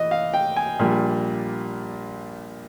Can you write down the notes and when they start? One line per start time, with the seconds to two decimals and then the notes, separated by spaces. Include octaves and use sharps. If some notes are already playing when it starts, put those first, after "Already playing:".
Already playing: E3 D#5
0.11 F5
0.34 G5
0.56 G#5
0.79 A#1 A#2 G3